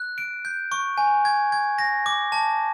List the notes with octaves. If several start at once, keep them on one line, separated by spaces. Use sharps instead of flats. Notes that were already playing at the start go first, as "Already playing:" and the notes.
Already playing: F#6
D7
G6
C#6
G#5
G#6
G#6
A#6
D6
A5